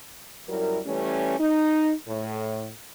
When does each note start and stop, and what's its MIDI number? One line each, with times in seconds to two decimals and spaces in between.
0.49 0.80 42
0.49 0.80 54
0.49 0.80 55
0.49 0.80 64
0.49 0.80 70
0.86 1.38 52
0.86 1.38 55
0.86 1.38 57
0.86 1.38 61
1.39 1.93 63
2.08 2.69 45